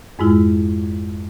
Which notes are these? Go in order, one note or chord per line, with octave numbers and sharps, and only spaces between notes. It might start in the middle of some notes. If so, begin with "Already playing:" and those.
F2 G#2 G#3 E4 F4